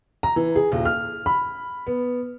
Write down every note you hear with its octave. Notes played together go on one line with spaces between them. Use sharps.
A#5
E3
G#4
D#1
F6
B5
B3